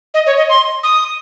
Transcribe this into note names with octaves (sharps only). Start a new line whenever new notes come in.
D#5
C#5
D#5
C6
D#6